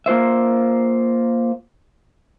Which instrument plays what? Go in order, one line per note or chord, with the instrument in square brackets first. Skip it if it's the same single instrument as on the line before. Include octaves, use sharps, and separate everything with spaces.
[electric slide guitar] A#3 F4 C5 E5